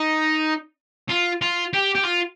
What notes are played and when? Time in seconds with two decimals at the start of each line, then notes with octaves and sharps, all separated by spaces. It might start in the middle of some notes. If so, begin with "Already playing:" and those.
Already playing: D#4
1.09 F4
1.42 F4
1.73 G4
1.95 G4
2.04 F4